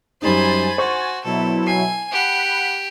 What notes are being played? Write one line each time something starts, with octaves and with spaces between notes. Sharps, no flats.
F#2 G3 D#4 C5 G#5 B5 A6
F#4 C5 C6 C#6
B2 F#3 E4 A4
G#5 C7
G4 F#5 B5